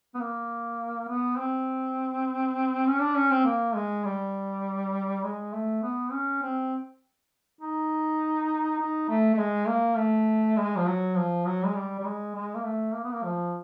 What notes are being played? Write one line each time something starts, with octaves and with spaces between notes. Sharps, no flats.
B3
A#3
B3
C4
C#4
D4
C#4
C4
A#3
G#3
G3
G#3
A3
B3
C#4
C4
D#4
D#4
A3
A3
G#3
A#3
A3
G#3
F3
F#3
F3
F#3
G#3
G3
G3
G#3
G#3
A#3
A3
A#3
B3
A#3
F3